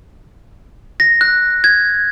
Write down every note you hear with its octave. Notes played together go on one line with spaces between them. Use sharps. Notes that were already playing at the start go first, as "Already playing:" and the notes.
A#6
F#6
G#6